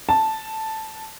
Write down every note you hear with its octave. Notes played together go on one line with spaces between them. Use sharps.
A5